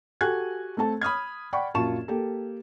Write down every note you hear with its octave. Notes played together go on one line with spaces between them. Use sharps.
F#4 G4 A4 G#5 F#6 G#6
A3 C4 A4 A5
B5 D#6 F6 G#6
D5 F#5 G5 B5 C#6
A#1 F#2 F4 A5 C#6 E7
A#3 G4 A4